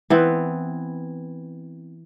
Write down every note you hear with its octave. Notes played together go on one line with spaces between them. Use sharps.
E3 B3 C4